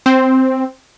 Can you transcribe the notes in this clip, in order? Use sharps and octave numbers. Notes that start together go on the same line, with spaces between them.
C4